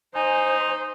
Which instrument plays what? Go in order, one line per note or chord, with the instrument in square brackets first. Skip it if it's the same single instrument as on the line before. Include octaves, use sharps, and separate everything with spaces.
[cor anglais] D#4 [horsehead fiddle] C5 [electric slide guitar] G#5